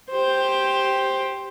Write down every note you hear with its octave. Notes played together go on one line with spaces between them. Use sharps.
G4 C5